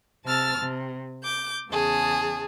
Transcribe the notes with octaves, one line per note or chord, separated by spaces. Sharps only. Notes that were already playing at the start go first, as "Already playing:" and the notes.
C3 A5 E6 F6 A6
C3
D6 G6
E2 C#3 G#4 A5